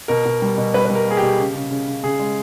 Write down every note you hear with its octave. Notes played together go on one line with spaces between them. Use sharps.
B2 A#4
B2
G3
B2
G3 B4
G3 B4
A#4
A#3 G#4
G4
B2
C#3
C#3
C#3
C#3
C#3 G#4
G#3